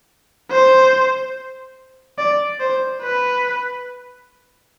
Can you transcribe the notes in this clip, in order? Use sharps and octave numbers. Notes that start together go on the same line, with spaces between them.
C5
D5
C5
B4